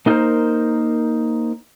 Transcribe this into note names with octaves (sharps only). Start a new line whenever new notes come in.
A#3 D#4 F4 G#4 A#4 C5